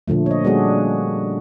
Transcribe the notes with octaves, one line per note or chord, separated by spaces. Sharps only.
A#2 D3 F3 A3
C#5 D#5
G3 A#3 C#4 D4 F#4 G#4